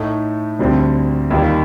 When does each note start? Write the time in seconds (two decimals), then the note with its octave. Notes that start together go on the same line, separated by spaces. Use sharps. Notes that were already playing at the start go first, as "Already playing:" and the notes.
Already playing: A2 A3 D#4
0.59 D2 D3 G3 C4
1.31 D#2 D#3 G3